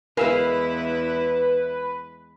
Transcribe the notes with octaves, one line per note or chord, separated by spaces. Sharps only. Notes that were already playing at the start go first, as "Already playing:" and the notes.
E2 G#3 E4 A#4 B4 E5 F5 G#5